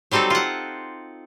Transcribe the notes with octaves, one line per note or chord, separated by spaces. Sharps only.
F#3 G3 C4 D#4 A4
F4 F#5